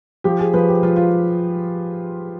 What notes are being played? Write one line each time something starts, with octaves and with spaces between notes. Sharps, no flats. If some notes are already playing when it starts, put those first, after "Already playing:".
F3 G4
G#4
F3 B4
G4
F3 F4
F4